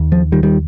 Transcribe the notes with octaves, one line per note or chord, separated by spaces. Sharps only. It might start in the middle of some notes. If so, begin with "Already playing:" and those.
Already playing: D#2
F3
D#3 G3
D#3 G3